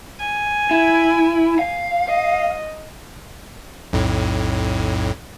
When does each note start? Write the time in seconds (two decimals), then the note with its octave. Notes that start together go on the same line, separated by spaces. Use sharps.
0.19 G#5
0.71 E4
1.59 F5
2.07 D#5
3.93 B1 F2 A2